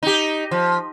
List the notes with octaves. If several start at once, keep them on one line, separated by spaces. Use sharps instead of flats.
D#4 G4
F3